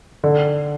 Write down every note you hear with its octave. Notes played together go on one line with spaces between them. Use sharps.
D3